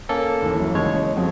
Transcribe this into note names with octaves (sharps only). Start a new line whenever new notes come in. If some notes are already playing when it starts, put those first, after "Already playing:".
A#3 C#4 A4
D#2 E3
F#2
D#2 C#3 E3 G#3 C#5
F2 F3 F#3